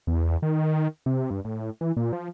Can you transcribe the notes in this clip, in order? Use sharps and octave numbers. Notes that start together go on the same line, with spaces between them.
E2
D#3
C3
G2
A2
E3
A#2
F3